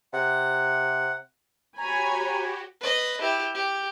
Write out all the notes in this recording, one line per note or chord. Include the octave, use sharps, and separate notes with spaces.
C3 F#5
F#4 G4 C#5 G#5 A#5 B5
B4 D#5
E4 G4
G4